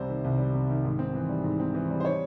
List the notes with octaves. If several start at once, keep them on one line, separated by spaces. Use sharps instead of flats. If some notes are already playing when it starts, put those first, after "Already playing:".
Already playing: C2 C3 G3 C5
D#3
C2
G3
C3
D#3
G#2
C4
E3
G3
G#2
C4
E3
G3
C5
C#5